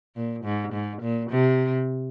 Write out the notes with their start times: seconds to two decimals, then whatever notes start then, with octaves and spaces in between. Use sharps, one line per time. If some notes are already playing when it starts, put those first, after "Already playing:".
0.16 A#2
0.44 G#2
0.73 G#2
1.02 A#2
1.30 C3